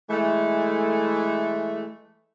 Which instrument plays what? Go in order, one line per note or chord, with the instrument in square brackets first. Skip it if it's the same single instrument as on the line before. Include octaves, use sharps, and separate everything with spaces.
[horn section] E3 G#3 A3